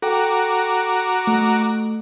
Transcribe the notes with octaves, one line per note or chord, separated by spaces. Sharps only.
F#4 A4 G5 A#5 D6
A3